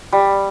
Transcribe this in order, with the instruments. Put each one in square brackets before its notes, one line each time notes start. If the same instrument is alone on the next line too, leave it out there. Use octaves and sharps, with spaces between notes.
[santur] G3